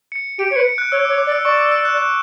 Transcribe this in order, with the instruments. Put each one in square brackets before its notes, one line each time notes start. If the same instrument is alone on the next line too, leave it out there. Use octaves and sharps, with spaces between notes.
[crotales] C#7
[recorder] G4 [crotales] D7
[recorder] C#5 [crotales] C#7
[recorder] B4
[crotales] C#7
F#6
[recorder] C#5 [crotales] E6
[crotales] D6
[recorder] C#5
[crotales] D6
[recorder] D5
[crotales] E6
[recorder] D5 [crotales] C#6
[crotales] E6
E6
F#6
F#6